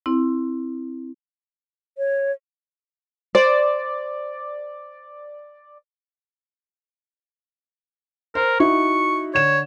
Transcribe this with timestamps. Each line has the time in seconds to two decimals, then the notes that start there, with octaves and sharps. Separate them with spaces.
0.06 C4 E4
1.98 C#5
3.35 C5 D5
8.35 A#4 C5
8.60 D#4 E4 F#4 C#6
9.35 D3 C#5 E7